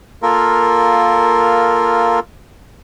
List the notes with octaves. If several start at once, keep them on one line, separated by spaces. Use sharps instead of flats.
A#3 F4 A4 A#4